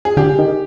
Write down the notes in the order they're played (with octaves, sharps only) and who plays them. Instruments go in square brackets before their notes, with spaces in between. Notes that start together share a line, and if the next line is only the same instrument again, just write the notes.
[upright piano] G#4
[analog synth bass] D3 [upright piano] G4
[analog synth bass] D#3